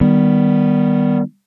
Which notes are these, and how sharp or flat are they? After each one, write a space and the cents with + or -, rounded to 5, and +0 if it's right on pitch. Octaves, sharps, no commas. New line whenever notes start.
D#3 -10 G3 +0 B3 +0